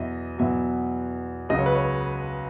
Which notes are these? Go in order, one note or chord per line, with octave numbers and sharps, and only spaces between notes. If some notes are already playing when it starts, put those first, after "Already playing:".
Already playing: E2 B2 F#3 D#5 E5
E2 B2 F#3 E5
C#2 C#3 F#3 D#5
C#5
B4
C#5